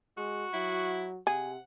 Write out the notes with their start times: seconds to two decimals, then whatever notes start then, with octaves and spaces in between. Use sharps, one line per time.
0.17 G#3 F#4
0.53 F#3 E4
1.27 C3 G#4 F#5